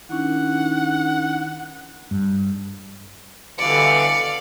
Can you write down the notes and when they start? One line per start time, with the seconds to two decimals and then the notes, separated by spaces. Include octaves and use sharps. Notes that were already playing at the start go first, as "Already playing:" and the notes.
0.10 D#3 C#4 D4 E4 F#5
2.11 G2
3.58 G2 B2 D3 E3 D5 F5 C#7